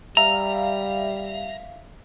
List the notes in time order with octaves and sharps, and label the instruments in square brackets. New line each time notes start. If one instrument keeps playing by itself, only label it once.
[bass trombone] G3 [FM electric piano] E5 F5 [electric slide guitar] A#5